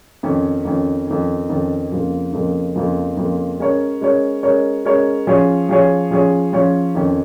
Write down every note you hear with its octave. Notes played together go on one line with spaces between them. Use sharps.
F2 D#3 C#4
F2 D#3 C#4
F2 D#3 C#4
F2 D#3 C#4
F2 C#3 F3 A#3
F2 C#3 F3 A#3
F2 C#3 F3 A#3
F2 C#3 F3 A#3
G#3 C#4 A#4 C#5
G#3 C#4 A#4 C#5
G#3 C#4 A#4 C#5
G#3 C#4 A#4 C#5
F3 C#4 G#4 C#5
F3 C#4 G#4 C#5
F3 C#4 G#4 C#5
F3 C#4 G#4 C#5
F2 D#3 C#4